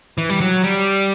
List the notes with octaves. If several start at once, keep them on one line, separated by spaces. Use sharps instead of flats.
E3
G3
F#3
G3